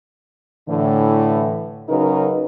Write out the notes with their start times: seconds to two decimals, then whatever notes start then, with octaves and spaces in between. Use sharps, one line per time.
0.69 A2 D3 E3
1.89 C#3 F#3 D#4 A#4 B4